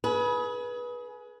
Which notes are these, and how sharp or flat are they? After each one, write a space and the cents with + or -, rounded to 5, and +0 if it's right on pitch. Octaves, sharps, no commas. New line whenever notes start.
G#4 +25 B4 -20